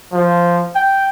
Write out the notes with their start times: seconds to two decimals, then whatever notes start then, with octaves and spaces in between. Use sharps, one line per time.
0.13 F3
0.75 G5